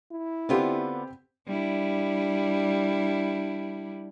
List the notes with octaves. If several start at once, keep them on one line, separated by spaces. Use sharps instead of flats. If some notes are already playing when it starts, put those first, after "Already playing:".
E4
D3 B3 C4 F4 G4
G3 D4 E4